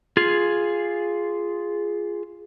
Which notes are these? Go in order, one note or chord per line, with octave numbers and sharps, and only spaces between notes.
F4 G#4